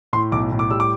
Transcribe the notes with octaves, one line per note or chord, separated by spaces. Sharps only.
A2 C6
B1 D6
A2
D6
G3 E6
D6